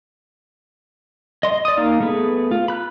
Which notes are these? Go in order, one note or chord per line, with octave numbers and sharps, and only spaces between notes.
D#5 C6
D5 D#6
A#3 D#4 F5
A3 B3 G#4 B4
F4
B5 F#6